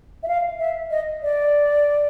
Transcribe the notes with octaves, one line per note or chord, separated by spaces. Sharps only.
E5
F5
E5
D#5
D5